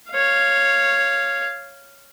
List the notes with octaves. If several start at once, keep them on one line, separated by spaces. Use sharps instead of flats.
C#5 F5